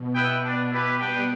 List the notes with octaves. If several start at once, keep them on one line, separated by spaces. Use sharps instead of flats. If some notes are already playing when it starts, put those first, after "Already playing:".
Already playing: B2
B3 E4 B4 E5 G5
B2 D4 B4 D5
E4 G4 B4
G3 B3 D4 B4 G5